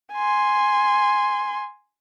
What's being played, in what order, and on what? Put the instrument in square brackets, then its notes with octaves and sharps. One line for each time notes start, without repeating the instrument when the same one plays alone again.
[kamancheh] G#5 C6